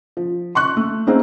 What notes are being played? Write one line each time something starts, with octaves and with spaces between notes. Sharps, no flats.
F3
C6 C#6 F#6
A3
A3 A#3 C4 D#4 G#4